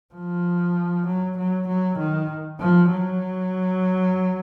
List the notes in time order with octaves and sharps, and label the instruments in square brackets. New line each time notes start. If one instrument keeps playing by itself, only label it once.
[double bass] F3
F#3
F#3
F#3
D#3
F3
F#3